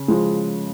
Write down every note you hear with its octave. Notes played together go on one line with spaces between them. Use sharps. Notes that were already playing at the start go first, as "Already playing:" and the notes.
Already playing: C#3
F3 G#3